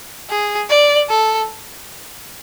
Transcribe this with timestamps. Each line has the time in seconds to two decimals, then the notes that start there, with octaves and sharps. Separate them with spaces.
0.29 G#4
0.69 D5
1.09 A4